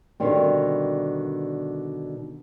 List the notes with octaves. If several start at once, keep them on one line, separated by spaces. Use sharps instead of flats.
B2 D3 D#3 G3 C4